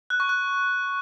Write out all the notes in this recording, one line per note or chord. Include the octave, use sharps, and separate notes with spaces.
F#6
C#6
F#6